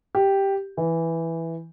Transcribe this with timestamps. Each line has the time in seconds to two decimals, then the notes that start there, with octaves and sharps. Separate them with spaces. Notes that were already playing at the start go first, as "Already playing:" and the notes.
0.15 G4
0.77 E3